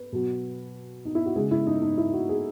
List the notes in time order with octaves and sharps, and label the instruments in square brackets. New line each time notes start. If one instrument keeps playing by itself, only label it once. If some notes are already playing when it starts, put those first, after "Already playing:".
Already playing: [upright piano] B4
B2 F#3
D#4
E4
F#4
C#3 G#3 G#4
E4
D#4
D#4
E4
F#4
G#4